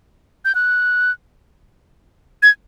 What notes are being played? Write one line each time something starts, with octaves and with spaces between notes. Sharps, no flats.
G6
F#6
G#6